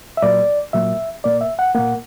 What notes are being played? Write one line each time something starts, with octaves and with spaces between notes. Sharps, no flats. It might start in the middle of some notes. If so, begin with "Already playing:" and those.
E5
A#2 F#3 A#3 D5
A#2 F#3 A#3 E5
A#2 A#3 D5
E5
F#5
A#2 A#3 F#5